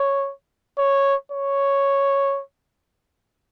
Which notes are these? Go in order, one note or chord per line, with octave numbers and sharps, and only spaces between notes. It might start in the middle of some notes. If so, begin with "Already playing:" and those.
Already playing: C#5
C#5
C#5